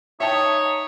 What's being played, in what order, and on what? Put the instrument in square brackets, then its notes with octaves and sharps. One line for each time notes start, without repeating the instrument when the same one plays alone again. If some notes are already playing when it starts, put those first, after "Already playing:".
[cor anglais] D#4 [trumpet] C#5 [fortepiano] E5 G5 A5